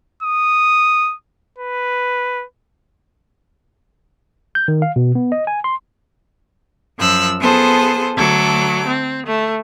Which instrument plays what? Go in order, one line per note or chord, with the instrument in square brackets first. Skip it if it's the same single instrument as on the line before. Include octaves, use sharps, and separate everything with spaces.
[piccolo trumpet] D#6
B4
[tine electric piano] G6
D#3
F5
B2
B3
D#5
G#5
C6
[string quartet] F#2 F3 E6 F#6
B3 F4 G#4 A4 C5 A5
D2 F#3 A4 D6
C4
A3